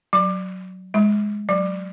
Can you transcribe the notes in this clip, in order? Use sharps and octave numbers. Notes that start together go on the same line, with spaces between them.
F#3
G#3
F#3